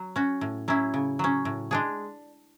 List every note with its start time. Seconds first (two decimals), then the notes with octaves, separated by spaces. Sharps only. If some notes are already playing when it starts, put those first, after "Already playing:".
Already playing: F#3
0.16 C#4 F#4
0.41 A2
0.68 F#3 C#4 E4
0.94 C#3
1.19 F#3 C#4
1.45 A2
1.71 G#3 D4 G#4